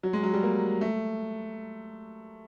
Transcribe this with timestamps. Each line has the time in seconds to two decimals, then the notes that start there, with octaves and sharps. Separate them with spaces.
0.03 F#3
0.13 G#3
0.23 F#3
0.34 G3
0.43 A#3
0.81 A3